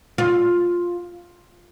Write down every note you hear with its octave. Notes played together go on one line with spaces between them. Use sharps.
F4